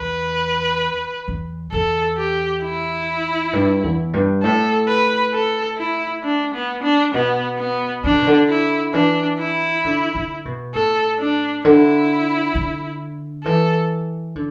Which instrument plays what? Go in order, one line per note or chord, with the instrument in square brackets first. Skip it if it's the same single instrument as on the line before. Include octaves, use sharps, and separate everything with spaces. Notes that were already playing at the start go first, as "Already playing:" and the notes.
Already playing: [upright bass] E2 [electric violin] B4
[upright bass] E2
[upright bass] E2 [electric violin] A4
[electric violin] G4
E4
[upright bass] G2
E2
G2
[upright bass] A2 [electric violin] A4
[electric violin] B4
A4
E4
D4
B3
D4
[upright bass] B2 [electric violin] B3
[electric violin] B3
[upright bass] E3 [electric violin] D4
[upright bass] D3
B2
D3
[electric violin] E4
[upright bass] E3 [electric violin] D4
[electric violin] E4
[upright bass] D3
D3
B2
[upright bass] A2 [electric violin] A4
[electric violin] D4
[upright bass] D3 [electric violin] E4
[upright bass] D3
[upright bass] E3 [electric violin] A4
[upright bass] D3